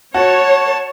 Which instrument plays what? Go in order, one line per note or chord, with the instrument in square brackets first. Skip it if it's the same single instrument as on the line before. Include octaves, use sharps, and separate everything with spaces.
[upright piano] F#4 [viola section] C#5 [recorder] A5